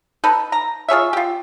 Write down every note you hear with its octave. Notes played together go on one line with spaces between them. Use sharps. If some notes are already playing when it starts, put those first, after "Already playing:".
D#4 A4 B4
A#5
F4 G#4 C#5 E5
F4 G4